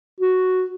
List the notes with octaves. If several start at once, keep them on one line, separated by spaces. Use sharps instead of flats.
F#4